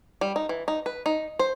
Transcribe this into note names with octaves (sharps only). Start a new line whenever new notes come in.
G3
D#4
E3
D#4
B4
D#4
C5